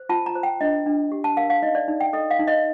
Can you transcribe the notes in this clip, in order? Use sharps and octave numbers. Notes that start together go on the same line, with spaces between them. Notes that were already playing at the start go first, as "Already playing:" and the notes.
Already playing: C5
F4 A5
A#5
C5
G5
D4 D#5
D4
G4
A5
A#4 F5
F5
D#4 D#5
D5
D#4
G5
A4 D#5
F5
D#4
D#5